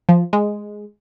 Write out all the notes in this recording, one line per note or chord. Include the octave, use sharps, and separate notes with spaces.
F3
G#3